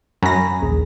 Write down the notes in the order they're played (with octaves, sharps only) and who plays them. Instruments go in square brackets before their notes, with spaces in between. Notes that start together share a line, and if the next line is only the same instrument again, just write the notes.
[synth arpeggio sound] F#2 A#6 [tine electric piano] G#5 A#5 B5
[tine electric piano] A#1 D#2 G#4